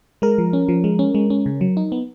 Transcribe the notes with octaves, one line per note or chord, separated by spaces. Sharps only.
G#3 A#4
F3
C#4
F3
G#3
C#4
G#3
C#4
C#3
F#3
D#4
B3